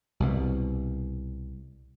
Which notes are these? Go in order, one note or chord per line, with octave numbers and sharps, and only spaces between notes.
C2 B2